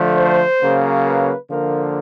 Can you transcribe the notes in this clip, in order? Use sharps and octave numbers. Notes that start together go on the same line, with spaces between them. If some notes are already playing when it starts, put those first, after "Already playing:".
Already playing: D3 F3 A3
C5
C#3 F#3 A#3
B4
D3 F3 A#3 A#4